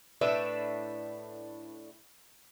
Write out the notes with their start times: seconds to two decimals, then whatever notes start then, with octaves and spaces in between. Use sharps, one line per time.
0.21 A2 D4 B4 E5